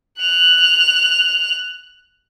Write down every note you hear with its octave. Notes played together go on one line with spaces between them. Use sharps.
F#6 F7